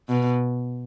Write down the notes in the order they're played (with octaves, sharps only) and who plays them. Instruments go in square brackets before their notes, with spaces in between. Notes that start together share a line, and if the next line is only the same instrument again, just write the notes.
[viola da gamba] B2